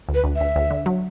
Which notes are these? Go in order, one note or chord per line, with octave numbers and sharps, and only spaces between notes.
D2
B4
D2
E5
D2
D2
D3
F#3